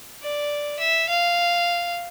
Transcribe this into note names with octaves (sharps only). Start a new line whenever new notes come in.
D5
E5
F5